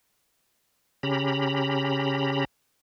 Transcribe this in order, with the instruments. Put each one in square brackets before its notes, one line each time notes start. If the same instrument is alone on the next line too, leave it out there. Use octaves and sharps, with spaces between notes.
[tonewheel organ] C#3 C#4 G4 A#5 B5